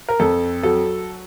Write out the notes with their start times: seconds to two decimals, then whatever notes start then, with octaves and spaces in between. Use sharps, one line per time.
0.09 A#4
0.19 F2 A4
0.63 F#3 A4